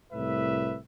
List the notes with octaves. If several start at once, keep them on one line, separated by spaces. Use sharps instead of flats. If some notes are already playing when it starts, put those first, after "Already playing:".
C2 A2 B4 E5